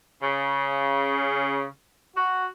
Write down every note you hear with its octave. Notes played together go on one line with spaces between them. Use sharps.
C#3
F#4